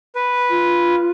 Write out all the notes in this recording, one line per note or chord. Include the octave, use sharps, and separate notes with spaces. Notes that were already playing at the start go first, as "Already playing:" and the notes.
B4
F4